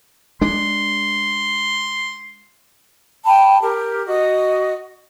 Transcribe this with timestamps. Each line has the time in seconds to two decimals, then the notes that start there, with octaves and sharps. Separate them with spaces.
0.41 G#3 D4 C6
3.26 G5 A5 B5
3.61 G4 A#4
4.07 F#4 D#5